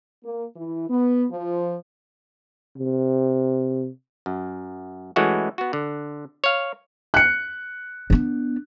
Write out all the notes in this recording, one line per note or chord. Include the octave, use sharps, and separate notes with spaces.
A#3
E3
B3
F3
C3
F#2
E3 G#3 A3 C#4 E4 F#4
B3 F#4
D3
C#5 F5
F#6 C#7
B3 D4